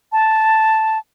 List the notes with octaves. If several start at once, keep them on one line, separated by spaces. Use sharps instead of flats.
A5